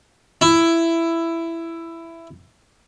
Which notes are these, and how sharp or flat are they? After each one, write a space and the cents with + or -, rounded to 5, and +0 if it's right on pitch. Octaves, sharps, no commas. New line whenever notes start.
E4 +10